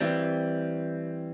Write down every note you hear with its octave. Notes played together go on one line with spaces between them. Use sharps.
E3 G3 C4